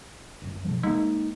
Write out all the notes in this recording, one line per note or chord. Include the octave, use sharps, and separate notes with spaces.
D1 F#2
F#1 B2 F3
G#3 A#3 D#4